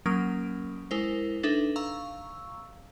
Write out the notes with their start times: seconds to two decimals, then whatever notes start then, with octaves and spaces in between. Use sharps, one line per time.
0.06 F#3 A#3 C#4 A#4 D#6 D7
0.91 G#3 E4 A#4 C5
1.43 D4 D#4 A4 B4 E5
1.76 F5 A#5 C#6 E6